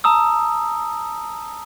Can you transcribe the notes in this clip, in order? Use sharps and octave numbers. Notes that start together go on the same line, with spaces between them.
A5 A#5 D#6 E6